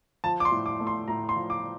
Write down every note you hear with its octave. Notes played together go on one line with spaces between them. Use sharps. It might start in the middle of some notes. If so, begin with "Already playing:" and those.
F3 A5
D6
C6
A2
D6
A3
C6
A2 A#5
C6
F3
D6